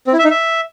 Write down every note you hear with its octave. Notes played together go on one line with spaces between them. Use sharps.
C4
E4
E5
D#4
E5